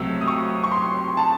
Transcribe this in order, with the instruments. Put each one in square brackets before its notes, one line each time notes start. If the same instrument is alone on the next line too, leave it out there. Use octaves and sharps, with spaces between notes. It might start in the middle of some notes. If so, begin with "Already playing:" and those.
Already playing: [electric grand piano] C#2 C3 F#3 A3 C4 [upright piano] E6
[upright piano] D#6
C#6
C#6
C6
A5